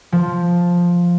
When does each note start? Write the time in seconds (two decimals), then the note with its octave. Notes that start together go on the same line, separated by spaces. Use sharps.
0.12 F3